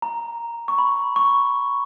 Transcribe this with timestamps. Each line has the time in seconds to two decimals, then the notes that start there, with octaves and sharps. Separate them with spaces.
0.02 A#5
0.68 C#6
0.78 B5
1.16 C#6